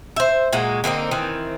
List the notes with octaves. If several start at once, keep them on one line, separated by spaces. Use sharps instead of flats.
C5 E5
A#2 G#3 A#3 F#4
D3 A#3 C4 D#4
D#3 E3 C4